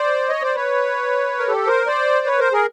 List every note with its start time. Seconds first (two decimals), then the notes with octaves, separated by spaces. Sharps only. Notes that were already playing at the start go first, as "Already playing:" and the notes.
Already playing: C5 D5
0.29 C#5 D#5
0.42 C5 D5
0.55 B4 C#5
1.38 A#4
1.48 G4 A4
1.67 A#4 C5
1.87 C5 D5
2.26 B4 C#5
2.39 A#4 C5
2.52 G#4 A#4